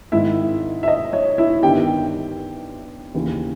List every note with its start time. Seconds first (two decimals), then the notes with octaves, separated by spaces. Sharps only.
0.12 G#1 G#2 D#3 E4 E5
0.83 E5
0.88 D#5
1.13 C#5
1.38 E4 E5
1.63 G1 G2 D#3 G4 G5
3.14 D#2 C#3 E3